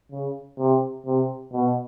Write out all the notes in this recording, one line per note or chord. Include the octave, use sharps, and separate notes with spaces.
C#3
C3
C3
B2